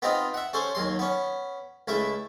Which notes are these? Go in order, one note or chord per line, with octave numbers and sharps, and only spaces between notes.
B3 C4 D#4 F4
E5 F#5
C#4 A4 C5 C#5
D#2 F#3 C6
B3 C#4
C#2 A3 E4 E5